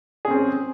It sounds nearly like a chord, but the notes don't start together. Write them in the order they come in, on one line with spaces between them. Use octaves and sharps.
G#4 C#4 C4